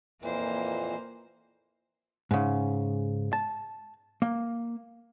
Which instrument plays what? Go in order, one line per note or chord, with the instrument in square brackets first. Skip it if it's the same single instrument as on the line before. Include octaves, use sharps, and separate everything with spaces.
[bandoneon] F2 A#2 E3 [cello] A#3 C5
[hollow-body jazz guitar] G#2 C#3
A5
A#3